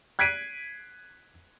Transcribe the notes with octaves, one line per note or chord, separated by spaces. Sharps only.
F#6 G#6 B6 C7 D7 D#7